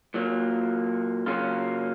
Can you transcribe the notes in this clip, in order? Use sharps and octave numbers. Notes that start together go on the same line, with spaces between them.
A#2 F#3 A#3
C#3 F#3 A#3 C#4 F4